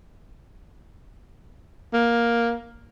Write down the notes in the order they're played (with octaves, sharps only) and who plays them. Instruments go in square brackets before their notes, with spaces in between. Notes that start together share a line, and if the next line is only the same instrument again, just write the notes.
[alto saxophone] A#3